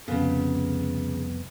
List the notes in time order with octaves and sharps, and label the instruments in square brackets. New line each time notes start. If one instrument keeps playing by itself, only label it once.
[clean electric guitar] C2 F2 B3 [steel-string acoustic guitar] C#3